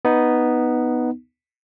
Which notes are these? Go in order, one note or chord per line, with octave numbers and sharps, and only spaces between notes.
B3 D#4